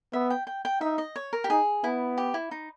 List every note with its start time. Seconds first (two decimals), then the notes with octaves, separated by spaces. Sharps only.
0.13 B3 E5
0.30 G5
0.47 G5
0.65 G5
0.81 D#4 E5
0.98 D#5
1.16 C#5
1.33 A#4
1.44 G4
1.50 D#4 G#4
1.83 B3 E4
2.18 G4
2.34 E4
2.51 D#4